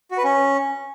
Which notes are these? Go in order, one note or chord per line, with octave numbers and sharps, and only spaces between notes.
F#4
B4
C#4